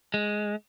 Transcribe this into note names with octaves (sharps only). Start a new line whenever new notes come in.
G#3